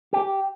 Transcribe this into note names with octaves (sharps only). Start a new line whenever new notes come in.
G4